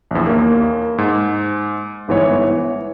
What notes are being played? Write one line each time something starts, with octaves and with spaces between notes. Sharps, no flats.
A#1 E2
D#2 A#3
G#2
G1 G#2 E3 B3 C#5
E3